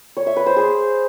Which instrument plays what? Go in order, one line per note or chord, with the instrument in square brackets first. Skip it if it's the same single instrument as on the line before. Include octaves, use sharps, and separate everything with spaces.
[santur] C#5
E5
B4
C5
G#4